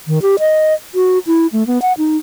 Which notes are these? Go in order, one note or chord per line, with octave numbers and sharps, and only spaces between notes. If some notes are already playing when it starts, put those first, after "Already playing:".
D#3
G4
D#5
F#4
E4
A3
B3
F#5
D#4